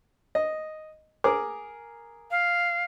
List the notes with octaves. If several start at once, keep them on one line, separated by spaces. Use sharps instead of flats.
D#5
G#4 A#4 D6
F5